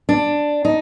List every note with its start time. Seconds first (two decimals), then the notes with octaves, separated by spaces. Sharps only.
0.09 D4
0.65 D#4